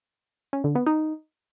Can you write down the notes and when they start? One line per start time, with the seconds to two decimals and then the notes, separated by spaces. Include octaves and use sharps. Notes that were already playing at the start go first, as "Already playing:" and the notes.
0.53 C#4
0.64 D3
0.75 B3
0.86 D#4